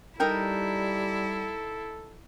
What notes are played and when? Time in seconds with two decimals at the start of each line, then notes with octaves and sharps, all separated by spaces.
0.20 G3 D#4 E4 A4 A#4 G5